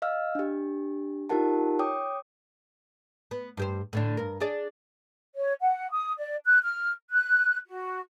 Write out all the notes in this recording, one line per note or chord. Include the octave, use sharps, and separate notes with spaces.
D#5 F5 E6 F6
D4 G4
D#4 F4 G4 A#4 F#5 A5
C#5 G5 D6 D#6
B3
G2 G4 C5
A2 D3 D4
G2 A#4
D4 G#4 D5
C#5
F#5
D#6
D5
F#6
F6
F#6
F#4